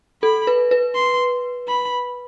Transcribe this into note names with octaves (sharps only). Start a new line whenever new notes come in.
A4 B5
B4
B4
C6
B5